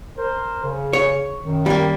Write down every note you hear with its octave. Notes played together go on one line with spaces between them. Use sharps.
A#4 C5
C#3
C#5
F#2 B2 D#3
G3 A#3